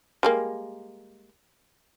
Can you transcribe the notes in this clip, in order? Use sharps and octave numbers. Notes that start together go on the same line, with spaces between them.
G3 G#3 A#3